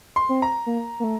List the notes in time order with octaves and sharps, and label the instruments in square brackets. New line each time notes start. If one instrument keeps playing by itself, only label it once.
[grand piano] C6
[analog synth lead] C4
[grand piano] A#5
[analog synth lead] A#3
A#3
A3